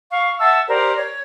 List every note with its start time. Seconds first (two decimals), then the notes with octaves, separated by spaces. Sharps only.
0.11 F5 C#6
0.40 E5 F#5 A5 E6
0.68 G4 A#4 C5 D5
0.97 C#5